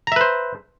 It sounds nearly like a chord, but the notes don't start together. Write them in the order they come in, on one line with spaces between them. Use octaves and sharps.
A#5 E5 B4 C5